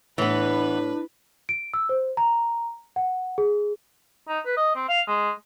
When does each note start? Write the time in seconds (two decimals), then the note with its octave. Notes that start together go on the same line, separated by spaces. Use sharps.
0.18 A2 E3 B3 D4 B4
1.49 D7
1.74 E6
1.89 C5
2.17 A#5
2.96 F#5
3.38 G#4
4.28 D#4
4.46 B4
4.57 D#5
4.76 C4
4.89 F5
5.07 G#3